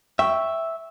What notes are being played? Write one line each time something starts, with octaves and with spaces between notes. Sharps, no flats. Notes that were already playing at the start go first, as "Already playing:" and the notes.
E5 G5 C#6